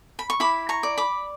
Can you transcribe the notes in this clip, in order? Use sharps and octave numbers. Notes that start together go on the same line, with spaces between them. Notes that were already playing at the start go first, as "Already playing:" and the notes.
B5
C#6
E4 B5 D6
A#5 C#6
D5
B5 D6